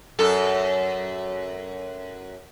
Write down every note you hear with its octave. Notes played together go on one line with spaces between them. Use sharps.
F#2 A4